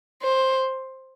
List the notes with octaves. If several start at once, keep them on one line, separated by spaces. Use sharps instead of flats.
C5